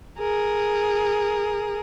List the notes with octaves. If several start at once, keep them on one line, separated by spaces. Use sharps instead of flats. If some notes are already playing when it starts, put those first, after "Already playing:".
G#4 A#4